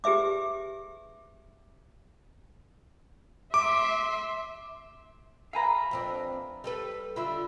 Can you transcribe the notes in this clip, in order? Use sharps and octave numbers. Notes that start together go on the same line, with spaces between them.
G4 G#4 B4 E5 D6
E5 C6 D6
B4 E5 F5 G#5 A#5
F2 C4 D4
G3 A4 B4
D3 F4 E5 B5